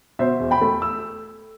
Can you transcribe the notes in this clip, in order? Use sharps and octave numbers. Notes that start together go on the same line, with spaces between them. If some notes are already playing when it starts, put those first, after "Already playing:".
B2 C5 E5
E2
G5 B5
A3
E6